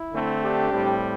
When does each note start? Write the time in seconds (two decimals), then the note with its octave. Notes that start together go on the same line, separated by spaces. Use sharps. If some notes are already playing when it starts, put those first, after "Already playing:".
Already playing: E4
0.13 D3 A3 C4
0.42 D4 G4
0.71 A2 G3 C4